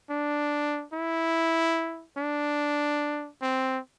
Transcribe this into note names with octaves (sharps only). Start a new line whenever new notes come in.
D4
E4
D4
C4